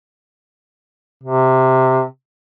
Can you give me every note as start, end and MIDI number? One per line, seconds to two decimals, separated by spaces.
1.24 2.04 48